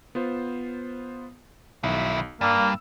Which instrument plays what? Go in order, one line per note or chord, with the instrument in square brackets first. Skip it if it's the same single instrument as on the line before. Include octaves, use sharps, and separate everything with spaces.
[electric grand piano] B3 F4 C5
[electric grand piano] B1 [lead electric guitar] D#3 E4
[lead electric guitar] G2 [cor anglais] A#3 [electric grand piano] D5 E6